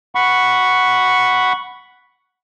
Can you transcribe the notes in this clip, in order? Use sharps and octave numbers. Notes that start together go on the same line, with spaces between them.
F#5 B5 C#6